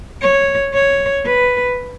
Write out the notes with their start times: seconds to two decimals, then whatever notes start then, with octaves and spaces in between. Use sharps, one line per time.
0.22 C#5
0.74 C#5
1.25 B4